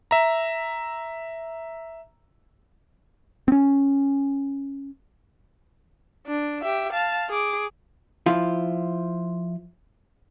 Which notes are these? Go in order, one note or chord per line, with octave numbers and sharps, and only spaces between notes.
E5 A#5
C4 C#4
D4
G4 E5
F5 A5
G#4 D6
F3 E4 F4